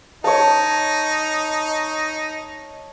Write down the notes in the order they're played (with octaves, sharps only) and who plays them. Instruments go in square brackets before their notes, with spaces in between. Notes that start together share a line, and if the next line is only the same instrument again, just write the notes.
[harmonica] D#4 [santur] C#5 A5